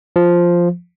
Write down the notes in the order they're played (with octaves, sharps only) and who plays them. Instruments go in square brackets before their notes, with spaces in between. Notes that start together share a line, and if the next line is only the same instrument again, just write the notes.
[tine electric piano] F3